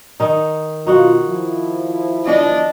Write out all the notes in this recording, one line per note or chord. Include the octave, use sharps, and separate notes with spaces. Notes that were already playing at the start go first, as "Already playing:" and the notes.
D#3 D#4
B2 D#4 F4 F#4 F#5
F3 E4
D4 D#5